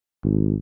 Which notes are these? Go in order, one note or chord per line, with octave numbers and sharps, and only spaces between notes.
G#1